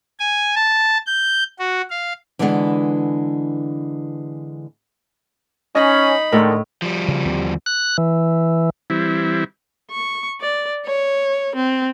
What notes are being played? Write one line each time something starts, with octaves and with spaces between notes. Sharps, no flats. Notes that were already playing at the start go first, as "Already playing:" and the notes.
G#5
A5
G6
F#4
F5
D3 E3 G3 G#3 B3 D4
C#4 D#4 D#5 B5
A2 D3 D#3 G#3 A4 A#4
F3 G3
C#3
D#2 D3 C4
F#6
E3
E3 G3 C4 E4
C#6
D5
C#5
C4